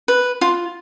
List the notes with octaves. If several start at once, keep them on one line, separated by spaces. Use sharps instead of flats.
B4
F4